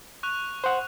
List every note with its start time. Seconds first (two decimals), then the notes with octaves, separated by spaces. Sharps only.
0.23 C#6 F#6 F7
0.64 C5 F#5